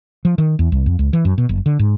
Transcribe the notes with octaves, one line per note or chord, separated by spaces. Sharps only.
F3
D#3
E2
C2
F2
C#2
E3
F#2
B2
F#1
D3
G#2